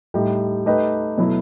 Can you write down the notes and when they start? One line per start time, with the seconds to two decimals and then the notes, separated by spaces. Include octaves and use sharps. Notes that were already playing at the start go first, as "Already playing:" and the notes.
0.14 A2 G3 D#4 G4
0.66 A3 D#4 G4 B4 D#5
1.18 B2 F#3 A3 E4